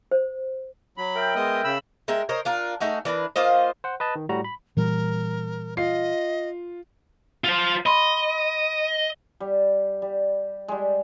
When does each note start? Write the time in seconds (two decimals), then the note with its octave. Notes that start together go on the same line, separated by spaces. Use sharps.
0.11 C5
0.98 F#3 B5
1.15 A#4 E5 G5
1.36 G#3 B3 D#5
1.64 C#3 B5 E6
2.08 G#3 A#4 E5 G5
2.29 A#4 C5 C#5 D#5
2.45 D4 F4 A#4
2.80 A3 D#4 F#4 G#4
3.05 E3 D4 A#4 B4
3.36 A#3 F4 C5 D#5
3.84 C5 F#5
4.00 B4 D#5 A5
4.15 D#3
4.29 A2 G3 F#4 A#5
4.44 B5
4.77 A#2 E3 G3 A#4
5.77 F4 D#5 C7
7.44 F4 C5
7.86 D#5 B5 C6
9.40 G3
10.02 G3
10.68 G3 G#3